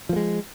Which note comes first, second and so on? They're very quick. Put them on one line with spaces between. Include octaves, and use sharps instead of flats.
F3 A#3 G#3